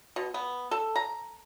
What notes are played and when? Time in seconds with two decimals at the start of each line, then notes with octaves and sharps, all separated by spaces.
0.16 B2
0.34 B3
0.71 A4
0.96 A#5